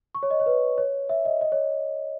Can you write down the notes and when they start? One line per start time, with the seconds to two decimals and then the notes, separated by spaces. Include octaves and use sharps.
0.15 C#6
0.23 C#5
0.31 D#5
0.40 C#5
0.46 B4
0.78 C#5
1.09 E5
1.25 D#5
1.41 D#5
1.52 C#5